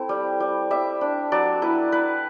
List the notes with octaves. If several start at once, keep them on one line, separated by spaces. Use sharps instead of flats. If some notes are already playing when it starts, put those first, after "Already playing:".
Already playing: A3 C4 E4
G3
G3
G3 E5
D4
F#3 D5
E4 B4
E4 B4